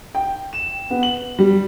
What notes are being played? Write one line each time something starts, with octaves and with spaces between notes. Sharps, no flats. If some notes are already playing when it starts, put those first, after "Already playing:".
G5
E7
B3
F#7
G3